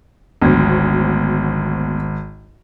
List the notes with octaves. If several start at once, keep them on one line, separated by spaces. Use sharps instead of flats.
G#1 D2 F#3 B3